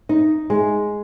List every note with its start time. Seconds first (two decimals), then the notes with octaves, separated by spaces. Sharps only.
0.09 D#4
0.50 G#3